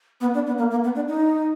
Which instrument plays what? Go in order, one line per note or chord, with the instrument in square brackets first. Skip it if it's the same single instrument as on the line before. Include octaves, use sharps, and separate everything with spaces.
[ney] B3
D4
B3
A#3
A#3
B3
D4
D#4